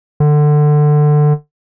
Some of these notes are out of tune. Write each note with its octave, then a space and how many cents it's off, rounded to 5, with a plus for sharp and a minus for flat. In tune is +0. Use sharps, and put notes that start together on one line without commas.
D3 +20